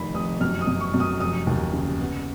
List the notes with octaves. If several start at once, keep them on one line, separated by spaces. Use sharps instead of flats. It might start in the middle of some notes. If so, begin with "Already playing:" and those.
Already playing: F1 D#3 B5
F1 D#6
F#2 F6
D#6
F#2
C#6
F#2
D#6
F1 D#6
D#2
C#3
B3